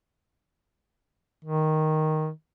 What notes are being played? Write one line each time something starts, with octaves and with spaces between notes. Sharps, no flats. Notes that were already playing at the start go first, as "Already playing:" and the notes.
D#3